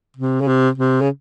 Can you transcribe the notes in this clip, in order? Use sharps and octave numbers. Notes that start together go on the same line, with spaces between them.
C3
C#3
C3
C3
C#3